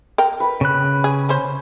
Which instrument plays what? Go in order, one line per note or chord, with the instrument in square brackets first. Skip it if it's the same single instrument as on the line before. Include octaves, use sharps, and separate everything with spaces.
[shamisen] A#4 G5
[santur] B4
[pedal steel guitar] C#3 F#6
[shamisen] G#4
C#4 C5